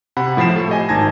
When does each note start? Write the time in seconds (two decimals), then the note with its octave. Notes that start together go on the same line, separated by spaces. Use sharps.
0.17 C3 F#5 B5
0.37 A2 F3 B5 C7 E7
0.56 A3
0.69 G4 D#5 G#5
0.89 G#1 D#4 A5 G#6 A#6